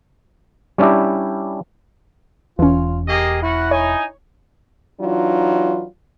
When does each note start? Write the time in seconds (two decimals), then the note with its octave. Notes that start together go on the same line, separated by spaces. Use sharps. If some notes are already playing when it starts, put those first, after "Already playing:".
0.78 G3 C#4 D4 E4 G4
2.59 E1 E2 E3 C#4 F4
3.07 A#3 G4 G#4 D#5
3.43 C#4 E4 F#4 F#5
3.71 D#4 C#5 G#5
4.99 E3 F#3 D4 D#4 F4